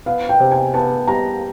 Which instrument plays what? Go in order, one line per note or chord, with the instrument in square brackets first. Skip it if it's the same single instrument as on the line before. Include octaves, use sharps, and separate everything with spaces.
[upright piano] B3 [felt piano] F5
[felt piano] G5
[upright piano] C3
[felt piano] G#5
[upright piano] B3 [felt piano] A5
[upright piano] G3 [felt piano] A#5